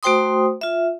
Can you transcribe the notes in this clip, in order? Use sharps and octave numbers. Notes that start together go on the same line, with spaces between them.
A3 F#4 C5 G5 C6 D#6
F4 E5